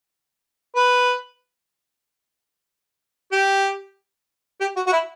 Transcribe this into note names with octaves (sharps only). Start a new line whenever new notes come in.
B4
G4
G4
F#4
F#4
E4